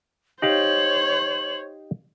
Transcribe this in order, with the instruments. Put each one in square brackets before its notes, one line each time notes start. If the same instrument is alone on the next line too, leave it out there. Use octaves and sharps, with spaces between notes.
[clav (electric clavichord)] D#4 G4 F5 [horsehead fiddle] C5 C#5 [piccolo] F#7